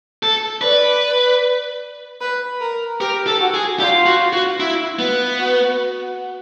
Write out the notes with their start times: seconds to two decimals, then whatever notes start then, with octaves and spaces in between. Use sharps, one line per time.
0.23 A4
0.62 B4 D5
2.21 B4
2.61 A#4
3.00 G4 A#4
3.27 A4
3.40 F#4
3.54 G#4
3.80 F4 G4
4.06 F#4
4.33 F#4
4.60 E4
4.99 B3
5.39 F#4